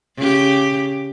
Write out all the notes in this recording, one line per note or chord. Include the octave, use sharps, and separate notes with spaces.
C#3 G4